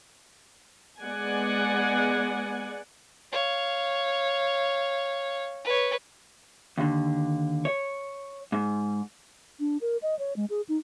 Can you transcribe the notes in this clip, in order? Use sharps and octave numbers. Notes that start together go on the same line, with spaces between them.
G#3 B3 D5 F#5 G#5
C#5 F5
B4 C#5
D#2 D3
C#5
G#2
D4
A#4
D#5
C#5
G#3
G#4
D#4